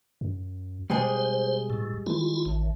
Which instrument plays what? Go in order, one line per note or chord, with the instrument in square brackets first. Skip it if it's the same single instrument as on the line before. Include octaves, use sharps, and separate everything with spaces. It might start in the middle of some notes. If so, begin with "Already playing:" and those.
[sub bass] F#2
[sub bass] B2 [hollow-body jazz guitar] G3 G#3 G#4 [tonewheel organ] C5
[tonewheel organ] A2
[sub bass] D#3 [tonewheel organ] E4 F4
[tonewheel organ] A1